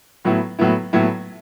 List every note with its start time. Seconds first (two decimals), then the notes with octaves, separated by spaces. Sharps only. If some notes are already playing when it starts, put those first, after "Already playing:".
0.25 A2 F#3 B3 E4
0.59 A2 F#3 B3 E4
0.93 A2 F#3 B3 E4